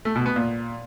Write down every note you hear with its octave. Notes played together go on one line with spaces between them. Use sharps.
A3
B2
B3
A#2